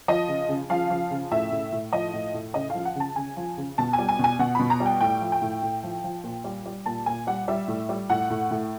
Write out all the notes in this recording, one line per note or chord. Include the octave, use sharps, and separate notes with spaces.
F3 D#5
C#3
C#3
F3 F5
F3
C#3
A2 E5
A2
A2
F3 D#5
A2
A2
C#3 D#5
F3 F5
F#5
C#3 A5
C#3 G#5
F3
C#3
B2 A5
G#5
G3
G#5
B2 G#5
B2 F#5
B2 B5
A#5
G3
G5
A2 G5
F3
G5
A2
A2
F3
F3
A#2
G3
G3
A#2 A5
A#2 G#5
G3 F#5
G3 E5
A2
G3
A2 F#5
A2
A2